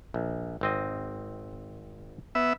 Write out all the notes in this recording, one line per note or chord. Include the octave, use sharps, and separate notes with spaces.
A#1
G#1 C4 D#5
B3 E5